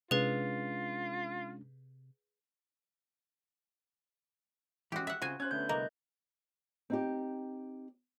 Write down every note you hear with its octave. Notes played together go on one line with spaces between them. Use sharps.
C3 G#3 C#4 D4 F4 G#4 B4
E3 G#3 C#4 F#4 G4
E5 F#5
C#3 C4 F4 F#4 G#5
C#4 C5 F#6 G#6
D3 A3 B3 G6
C2 A#3 D#5
C4 D#4 G4